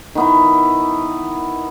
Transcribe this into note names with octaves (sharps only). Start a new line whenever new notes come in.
D#3 B3 E4